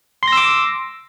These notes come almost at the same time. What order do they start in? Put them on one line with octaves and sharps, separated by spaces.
C6 A#6 E6 D6